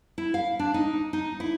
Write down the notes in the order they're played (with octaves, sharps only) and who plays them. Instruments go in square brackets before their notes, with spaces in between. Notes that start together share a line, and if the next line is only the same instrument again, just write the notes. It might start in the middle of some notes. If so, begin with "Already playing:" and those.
[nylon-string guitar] E4
F5
D4
D#4
D#4
E4